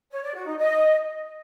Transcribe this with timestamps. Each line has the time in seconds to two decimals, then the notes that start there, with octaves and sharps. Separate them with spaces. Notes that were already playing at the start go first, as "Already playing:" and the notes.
0.11 C#5
0.23 D5
0.34 F#4
0.46 D#4
0.58 D#5